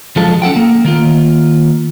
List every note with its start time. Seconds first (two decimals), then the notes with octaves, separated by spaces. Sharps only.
0.16 F3 F#3 G#3 F4 A4
0.42 C#4 A4 F#5 G5
0.56 A#3
0.84 D#3 A#3 F4